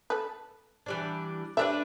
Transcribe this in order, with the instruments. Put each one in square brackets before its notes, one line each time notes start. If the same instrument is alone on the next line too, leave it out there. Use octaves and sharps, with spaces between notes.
[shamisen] A4 B4
[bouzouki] E3 G3 D4
[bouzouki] A3 D4 B4 [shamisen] G4 D5 E5